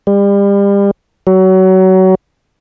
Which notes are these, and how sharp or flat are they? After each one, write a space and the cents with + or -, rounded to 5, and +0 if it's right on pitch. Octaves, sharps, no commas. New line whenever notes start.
G3 +35
F#3 +25